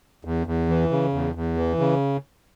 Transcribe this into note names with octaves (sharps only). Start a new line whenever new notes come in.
E2
E2
E3
C#3
E2
E2
E3
C#3